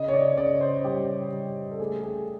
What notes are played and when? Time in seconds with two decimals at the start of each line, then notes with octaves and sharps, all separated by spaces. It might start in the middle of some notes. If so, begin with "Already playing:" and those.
Already playing: C#3 D#5
0.08 C#5
0.14 D5
0.37 C#3 D5
0.61 C5
0.84 G3 G4
1.33 G3
1.71 A4
1.80 A3 G#4
2.03 G#4